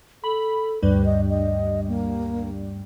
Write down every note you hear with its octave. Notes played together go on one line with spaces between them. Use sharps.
A4 B5
D2 G2 G3 B4
D#5
D#5
A#3